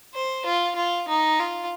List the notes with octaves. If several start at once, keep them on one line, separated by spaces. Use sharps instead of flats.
C5
F4
F4
D#4
F4